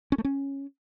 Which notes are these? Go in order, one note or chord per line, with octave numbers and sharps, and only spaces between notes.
C#4
A3
C#4